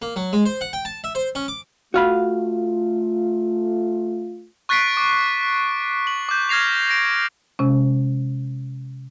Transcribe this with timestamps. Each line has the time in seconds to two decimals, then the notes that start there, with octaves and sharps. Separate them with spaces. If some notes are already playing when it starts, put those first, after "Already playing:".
0.02 A#3
0.16 F#3
0.33 G#3
0.46 C5
0.61 F#5
0.73 G5
0.85 A5
1.04 E5
1.15 C5
1.35 C#4
1.48 D6
1.94 A3 F4 F#4 F5 B5
4.69 C#6 F#6 A6 B6 C7 D7
4.97 D6
6.07 F#7
6.29 D6 G6
6.49 F6 G#6 A#6 C7 F7
6.89 A#6 D7
7.59 C3 G#3 C#4